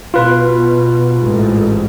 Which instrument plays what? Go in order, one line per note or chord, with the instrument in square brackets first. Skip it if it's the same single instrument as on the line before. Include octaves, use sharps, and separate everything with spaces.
[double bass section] B2 [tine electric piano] F4 B4
[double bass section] A1 G#2